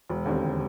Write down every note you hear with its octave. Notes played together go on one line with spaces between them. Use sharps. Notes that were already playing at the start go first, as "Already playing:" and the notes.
E1
D#2 D3 G3 C4